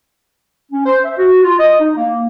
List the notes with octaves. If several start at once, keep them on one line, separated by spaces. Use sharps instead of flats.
C#4
C5
E5
F#4
F4
D#5
D#4
A#3